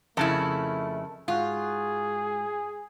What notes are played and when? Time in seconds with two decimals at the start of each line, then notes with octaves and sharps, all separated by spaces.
0.17 F2 C#3 A3 E4 A#4 D#5 A5
1.28 G#2 F4 F#4 G#4